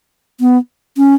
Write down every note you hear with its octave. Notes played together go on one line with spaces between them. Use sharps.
B3
C#4